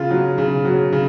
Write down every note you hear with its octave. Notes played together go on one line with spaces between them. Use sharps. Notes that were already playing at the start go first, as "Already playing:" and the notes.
Already playing: C#3 F4
F#3
C#3
F#3
C#3